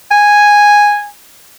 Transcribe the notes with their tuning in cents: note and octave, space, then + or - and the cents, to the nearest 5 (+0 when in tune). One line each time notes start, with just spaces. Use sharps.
G#5 -5